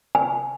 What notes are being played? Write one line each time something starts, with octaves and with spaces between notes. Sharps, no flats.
G#5